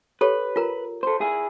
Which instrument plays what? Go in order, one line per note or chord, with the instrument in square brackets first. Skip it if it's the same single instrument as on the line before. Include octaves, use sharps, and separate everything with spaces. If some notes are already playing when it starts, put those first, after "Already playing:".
[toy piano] G4 A4 C#5 [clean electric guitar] B4
[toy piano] F4 A#4 A#5
[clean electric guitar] A4 C5
E4 G#4